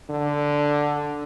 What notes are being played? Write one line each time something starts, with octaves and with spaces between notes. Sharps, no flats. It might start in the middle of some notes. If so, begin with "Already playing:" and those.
D3